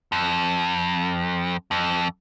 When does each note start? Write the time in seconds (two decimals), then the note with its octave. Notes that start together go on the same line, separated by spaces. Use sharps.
0.12 F2
1.71 F2